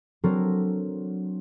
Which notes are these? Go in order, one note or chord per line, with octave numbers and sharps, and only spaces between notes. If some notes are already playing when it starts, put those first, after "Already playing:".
F#3 C4 D4 A4 A#4